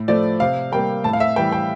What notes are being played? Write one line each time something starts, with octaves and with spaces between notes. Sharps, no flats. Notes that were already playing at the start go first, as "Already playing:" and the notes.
Already playing: A2
F3 A3 D5
C3 F5
G3 A#3 G5
A2 A5
F5
E5
E3 G3 G5
G5